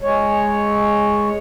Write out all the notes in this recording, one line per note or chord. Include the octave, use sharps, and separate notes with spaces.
G#3 C#5